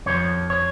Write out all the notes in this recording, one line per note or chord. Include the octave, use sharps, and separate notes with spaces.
F2 F3 C#5
C#5